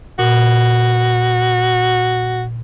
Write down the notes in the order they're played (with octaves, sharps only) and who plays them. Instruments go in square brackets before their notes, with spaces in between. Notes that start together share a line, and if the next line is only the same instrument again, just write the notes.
[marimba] A#2 [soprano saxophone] F#4